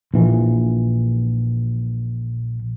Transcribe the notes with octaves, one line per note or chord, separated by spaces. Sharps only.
A#1 E3